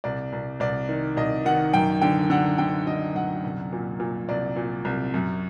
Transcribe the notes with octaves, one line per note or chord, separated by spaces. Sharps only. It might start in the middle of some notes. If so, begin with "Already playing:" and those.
C2 D5
C2
C2 D5
D#3
C2 D#5
D#3 F#5
F#2 G5
D3 G5
D3 F#5
D3 G5
D3 D#5
F#2 F#5
C2
A#2
A#2
C2 D5
A#2
C2
F#2